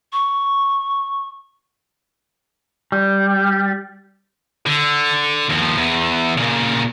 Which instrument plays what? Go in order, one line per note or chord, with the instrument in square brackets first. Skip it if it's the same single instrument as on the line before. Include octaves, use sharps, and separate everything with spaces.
[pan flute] C#6
[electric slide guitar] G3
[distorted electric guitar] D3
D#2 F3
E2
A#2 C#3